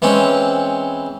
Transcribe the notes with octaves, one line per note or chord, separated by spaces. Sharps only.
E3 G#3 C4 C#4